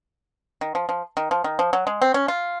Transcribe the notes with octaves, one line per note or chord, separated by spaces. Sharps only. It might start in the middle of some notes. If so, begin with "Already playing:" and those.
D#3
F3
F3
D#3
F3
D#3
F3
F#3
G#3
C4
C#4
F4